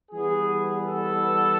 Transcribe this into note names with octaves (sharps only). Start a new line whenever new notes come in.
E3 G3 B3 G#4
A4